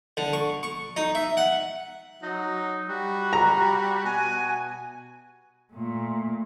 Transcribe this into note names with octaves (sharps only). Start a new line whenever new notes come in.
D3
C#6
C#6
D#4
E5
F#5
F#3 D#4
G3 F#4
A#5
B2 G#5
A#2 A3